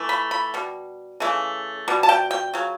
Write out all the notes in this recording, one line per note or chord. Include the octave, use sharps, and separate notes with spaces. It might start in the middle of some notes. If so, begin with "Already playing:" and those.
Already playing: E3 A3
B5
B5
B2 G3
C#3 E3 A3
B2 G3
A5
G5
G5
C#3 F#3